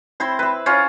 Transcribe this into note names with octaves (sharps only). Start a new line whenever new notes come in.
C4 E4 C5 C6
B4 E5
C#4 F4 C5